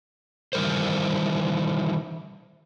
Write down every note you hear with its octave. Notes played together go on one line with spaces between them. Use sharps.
D#3 E3 G3 A#4 C5